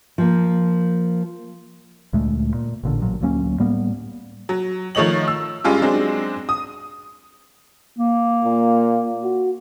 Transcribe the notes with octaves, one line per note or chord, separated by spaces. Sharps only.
F3 A#3
D2 A#2 G#3 A3
A#2
A1 A#2 D3
A1 A#2 F#3
D2 F#3 A#3 C#4
A2 G3 A#3 B3
F#3
D#3 F3 A3 C#5 D#5 F#7
E6
G2 G#3 C#4 F4 G4
F#3 G#3 C4 D4
D#6
A#3
A#2
F#4